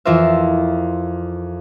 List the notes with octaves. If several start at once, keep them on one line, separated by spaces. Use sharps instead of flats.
F2 E3 F4 A#4 C5 E5